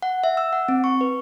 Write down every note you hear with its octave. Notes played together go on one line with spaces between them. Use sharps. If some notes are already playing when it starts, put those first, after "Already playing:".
F#5
E5
E6
F#5
C4
C#6
B4